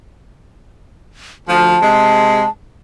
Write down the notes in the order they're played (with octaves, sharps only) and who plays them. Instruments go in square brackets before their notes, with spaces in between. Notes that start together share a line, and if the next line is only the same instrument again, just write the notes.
[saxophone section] D2 F3 [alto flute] A5
[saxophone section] C3 G#3